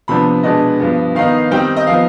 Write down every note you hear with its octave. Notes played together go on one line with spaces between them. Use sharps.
C3 F3 B3 D4 B5
B2 G#3 B3 D4 D#5
G2 F3 B3
D#3 B3 D#4 F5
D#3 G3 C4 D#4 G5
D#5
F3 B3 D#4 F5